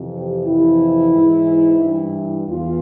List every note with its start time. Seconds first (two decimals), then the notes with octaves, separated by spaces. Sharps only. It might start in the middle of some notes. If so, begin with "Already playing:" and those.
Already playing: F2 C3 E3
0.14 G4
0.47 F2 C3 E3 E4
1.15 G#2 E3
1.82 G2 E3
2.48 E2 E3 F4